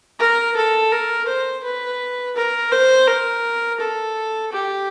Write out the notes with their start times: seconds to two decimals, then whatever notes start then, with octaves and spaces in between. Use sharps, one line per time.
0.20 A#4
0.56 A4
0.92 A#4
1.28 C5
1.64 B4
2.36 A#4
2.72 C5
3.08 A#4
3.80 A4
4.52 G4